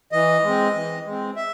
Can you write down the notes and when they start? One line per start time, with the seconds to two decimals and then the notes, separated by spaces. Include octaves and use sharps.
0.12 E3 D#5
0.43 G#3 C4
0.75 E3
1.05 G#3 C4
1.36 E5